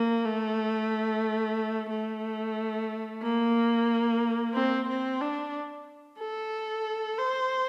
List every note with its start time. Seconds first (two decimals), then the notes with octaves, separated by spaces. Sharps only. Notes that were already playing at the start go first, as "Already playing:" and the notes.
Already playing: A#3
0.25 A3
1.90 A3
3.22 A#3
4.54 C4
4.88 C4
5.21 D4
6.19 A4
7.18 C5